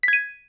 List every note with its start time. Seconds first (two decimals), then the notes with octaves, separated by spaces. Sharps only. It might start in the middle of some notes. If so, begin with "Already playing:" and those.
0.03 B6
0.08 G#6
0.13 D#7